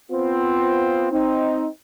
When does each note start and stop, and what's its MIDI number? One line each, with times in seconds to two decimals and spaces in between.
0.11 1.10 59
0.11 1.10 60
0.11 1.10 65
1.12 1.66 60
1.12 1.66 63